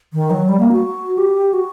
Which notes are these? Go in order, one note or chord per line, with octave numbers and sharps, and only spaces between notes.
D#3
F#3
G3
A#3
F#4
G4
F#4